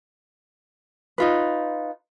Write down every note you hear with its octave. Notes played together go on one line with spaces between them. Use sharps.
D#4 F4 B4